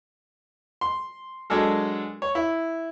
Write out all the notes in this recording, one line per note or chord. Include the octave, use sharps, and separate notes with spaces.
C6
F#3 G#3 D4 A4 A#4
C#5
E4